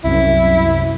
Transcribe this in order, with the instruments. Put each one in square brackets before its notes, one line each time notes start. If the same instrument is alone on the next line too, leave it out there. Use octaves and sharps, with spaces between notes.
[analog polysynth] C2 F#2 [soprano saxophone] E4